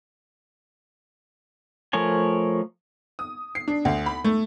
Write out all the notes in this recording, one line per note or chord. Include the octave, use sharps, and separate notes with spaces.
F3 A3 A#4 C#5 G#5
D#6
C7
D4
D2
B5
A3